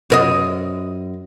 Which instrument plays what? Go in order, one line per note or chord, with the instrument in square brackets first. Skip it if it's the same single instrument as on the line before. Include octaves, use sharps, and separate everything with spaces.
[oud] F#2 A#4 D#5